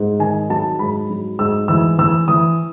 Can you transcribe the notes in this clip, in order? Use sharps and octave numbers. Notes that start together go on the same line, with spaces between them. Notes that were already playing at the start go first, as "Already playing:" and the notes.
Already playing: G#2
D#3 G#5
F#3 A5
G#2 B5
F#3
G#2 E6
E3 E6
E3 E6
E3 D#6